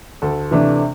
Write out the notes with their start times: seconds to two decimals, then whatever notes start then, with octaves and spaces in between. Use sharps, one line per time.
0.22 D2 A4
0.51 C3 E3 A3 D4